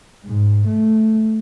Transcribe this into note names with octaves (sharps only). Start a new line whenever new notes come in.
G#2
A3